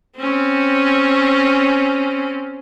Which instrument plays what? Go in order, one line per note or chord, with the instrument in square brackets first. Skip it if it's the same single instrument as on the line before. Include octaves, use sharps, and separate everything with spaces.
[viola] C4 C#4